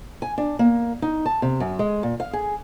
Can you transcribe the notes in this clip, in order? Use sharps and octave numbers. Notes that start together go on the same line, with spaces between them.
G#5
D4
A#3
D#4
A5
C3
F#2
G#3
A#2
F5
G#4